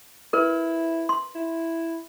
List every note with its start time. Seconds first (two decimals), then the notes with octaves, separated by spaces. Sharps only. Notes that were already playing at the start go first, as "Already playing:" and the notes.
0.33 E4 A#4 B4
1.09 C6
1.35 E4